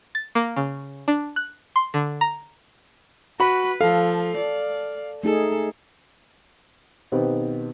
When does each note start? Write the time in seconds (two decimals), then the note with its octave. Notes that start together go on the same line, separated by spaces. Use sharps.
0.15 A6
0.35 A#3
0.56 C#3
1.08 D4
1.36 F#6
1.76 C6
1.94 D3
2.21 A#5
3.40 F#4 B4 B5
3.81 F3 A4 F5
4.37 D5
5.23 A3 D#4 G#4 A4
7.12 B1 D#3 B3 C4 G4